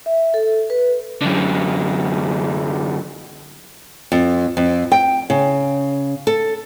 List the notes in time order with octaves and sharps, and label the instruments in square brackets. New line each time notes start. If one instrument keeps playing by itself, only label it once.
[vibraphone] E5
A4
B4
[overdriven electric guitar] F#2 D3
[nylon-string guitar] F2
F2
G5
C#3
A4